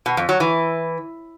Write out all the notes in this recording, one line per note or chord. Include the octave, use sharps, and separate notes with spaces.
B2
F2
F#3
E3